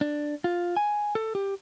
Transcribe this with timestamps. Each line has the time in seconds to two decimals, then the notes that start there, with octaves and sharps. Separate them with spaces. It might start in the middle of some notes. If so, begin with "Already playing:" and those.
0.01 D4
0.44 F4
0.77 G#5
1.15 A4
1.35 G4